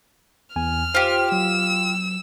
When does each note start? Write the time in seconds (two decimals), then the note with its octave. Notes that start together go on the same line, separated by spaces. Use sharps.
0.56 E2 G#5 F6
0.95 F4 G4 C5
1.32 F#3 E6